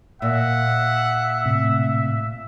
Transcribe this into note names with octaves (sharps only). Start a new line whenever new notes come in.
A#2 E5 F#5
A2 C3